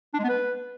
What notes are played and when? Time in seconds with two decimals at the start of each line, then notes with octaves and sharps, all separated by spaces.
0.14 D4
0.19 G#3
0.24 B3
0.29 B4